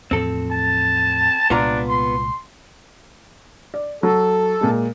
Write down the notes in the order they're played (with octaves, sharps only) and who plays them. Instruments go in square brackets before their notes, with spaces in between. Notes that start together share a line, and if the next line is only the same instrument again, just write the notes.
[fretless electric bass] E2 A2 F3 [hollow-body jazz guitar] C4 A4
[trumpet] A5
[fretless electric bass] C2 A#2 G#3 [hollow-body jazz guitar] B3 F4 A#5 [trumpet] D4
[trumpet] C6
[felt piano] D5
[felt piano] F#3 [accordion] A4
[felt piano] A#2 G#3